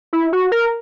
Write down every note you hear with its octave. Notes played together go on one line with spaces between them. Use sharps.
E4
F#4
A#4